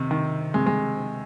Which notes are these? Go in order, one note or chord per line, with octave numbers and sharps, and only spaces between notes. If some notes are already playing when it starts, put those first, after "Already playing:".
Already playing: C3 D#3
D#3
C3 G#3
G#3